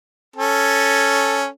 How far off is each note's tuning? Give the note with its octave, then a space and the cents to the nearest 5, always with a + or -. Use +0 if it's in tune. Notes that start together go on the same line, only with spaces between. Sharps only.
C#4 +0 A4 +0